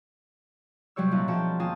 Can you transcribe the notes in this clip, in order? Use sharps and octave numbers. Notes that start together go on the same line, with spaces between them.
C3 F#3 G3 G4 C#5 E6
A#2 C#4 D#4 E4 A5 F#6
B2 F3 F#4 G#4 G5 A5
D#2 C4 F4 G#5 A5 D#6